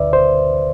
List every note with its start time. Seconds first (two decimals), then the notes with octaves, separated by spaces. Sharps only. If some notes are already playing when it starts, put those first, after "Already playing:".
Already playing: D2 D3 B4 D5 E5
0.13 C5